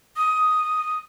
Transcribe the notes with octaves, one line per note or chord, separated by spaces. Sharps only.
D#6